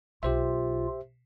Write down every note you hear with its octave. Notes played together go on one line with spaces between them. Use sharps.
B1 F4 G4 C5 E5